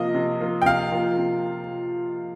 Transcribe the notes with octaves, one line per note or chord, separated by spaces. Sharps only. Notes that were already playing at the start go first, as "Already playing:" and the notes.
Already playing: C3 F3 A#3 F4 D#5
C3
F3 A#3 F4
G5
C3 F5
F3 A#3 F4
C3